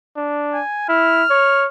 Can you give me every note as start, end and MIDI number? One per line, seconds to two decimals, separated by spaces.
0.17 0.61 62
0.54 0.86 80
0.89 1.24 64
0.89 1.68 89
1.30 1.66 73